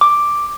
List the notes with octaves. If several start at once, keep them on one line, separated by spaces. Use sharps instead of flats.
D6